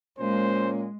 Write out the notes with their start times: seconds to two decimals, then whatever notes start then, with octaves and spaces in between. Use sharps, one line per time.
0.19 A#2 G#3 A#3 C#4 C5